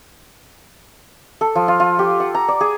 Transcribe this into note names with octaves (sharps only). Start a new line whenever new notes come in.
A4
F3
F4
F4
G4
F#5
A#5
D5
G#4